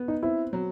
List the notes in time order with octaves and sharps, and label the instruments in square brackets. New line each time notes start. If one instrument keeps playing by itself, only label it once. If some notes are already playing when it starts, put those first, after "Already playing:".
Already playing: [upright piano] B3
[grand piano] D#4
[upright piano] C4 [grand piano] E4
[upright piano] F#3